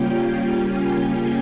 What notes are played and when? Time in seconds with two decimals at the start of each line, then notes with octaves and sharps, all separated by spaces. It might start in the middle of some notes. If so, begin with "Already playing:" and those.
Already playing: C#3 G3 A#3 C#4 F4 G5
0.15 G5
0.71 G#5